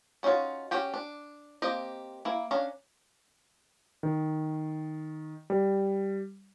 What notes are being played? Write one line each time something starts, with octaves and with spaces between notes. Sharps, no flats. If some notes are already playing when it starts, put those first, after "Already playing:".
B3 C#4 D#4 F4 F#4
C#4 F#4 G4 G5
D4
A#3 C4 G4 D#5
A#3 E4
C#4 D4 F5 A#5
D#3
G3